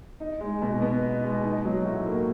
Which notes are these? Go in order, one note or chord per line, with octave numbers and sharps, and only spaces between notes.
D#4
G#3
B2
B3
D#4
G#3
D#4
F#3
A2
A#3